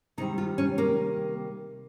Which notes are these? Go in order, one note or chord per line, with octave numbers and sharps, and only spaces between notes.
C3 D#3 G3 D#4
F4
C#4
A#3